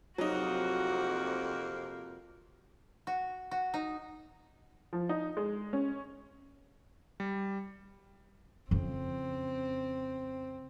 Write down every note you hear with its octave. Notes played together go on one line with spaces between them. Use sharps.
F2 C3 F#3 A#3 D#4 F#4
F#4
F#4
D#4
F3
D#4
G#3
C#4
G3
F2 C#3 C4